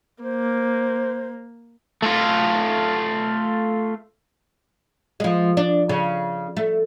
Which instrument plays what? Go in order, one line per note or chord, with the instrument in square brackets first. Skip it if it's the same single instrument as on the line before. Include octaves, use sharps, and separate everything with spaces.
[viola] A#3 [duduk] C5
[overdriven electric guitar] A3 F4
[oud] F3 G#3
D4
C#3
A3